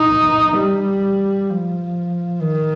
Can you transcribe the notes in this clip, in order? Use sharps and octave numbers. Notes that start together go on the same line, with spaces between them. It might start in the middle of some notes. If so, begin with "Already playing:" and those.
Already playing: D#4
G3
F3
D#3